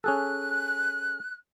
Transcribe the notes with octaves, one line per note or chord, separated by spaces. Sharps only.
C#4 G#4 A4 F#6